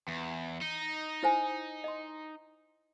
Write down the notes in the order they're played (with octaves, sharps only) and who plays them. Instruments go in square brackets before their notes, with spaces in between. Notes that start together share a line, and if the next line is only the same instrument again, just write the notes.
[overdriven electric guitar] E2
D#4
[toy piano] E4 C5 G#5
D#5 C6